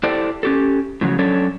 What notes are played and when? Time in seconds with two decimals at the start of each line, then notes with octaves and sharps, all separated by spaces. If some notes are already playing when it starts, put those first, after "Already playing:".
0.03 E4 G4 A4 C5 D5
0.43 C#4 G4 A4
1.01 A2 C#3 F3 F#3
1.19 F#3 C#4 D4 A4 C#5